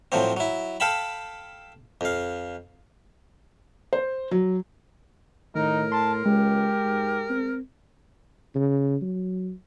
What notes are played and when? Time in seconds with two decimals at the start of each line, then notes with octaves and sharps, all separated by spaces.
0.12 A2 F3 F#3 C4
0.37 F#3 E4
0.80 A4 F5 G5 A5 B5
2.01 F2 F5
3.93 C5
4.31 F#3
5.55 A2 D#3 D#4 A#4
5.92 A5 C6
6.26 C#2 G#3 G4
6.84 G#2
7.29 C4
8.55 C#3
9.02 F#3